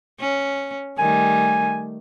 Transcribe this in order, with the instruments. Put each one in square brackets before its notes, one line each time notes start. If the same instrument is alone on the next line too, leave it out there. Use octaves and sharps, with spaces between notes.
[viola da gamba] C#4
[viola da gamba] D#3 G3 A3 [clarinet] G#5